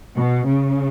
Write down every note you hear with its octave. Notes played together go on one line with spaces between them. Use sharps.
B2
C#3